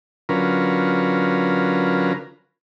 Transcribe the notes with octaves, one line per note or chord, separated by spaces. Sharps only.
D3 F#3 C#4 F4 A#4 B4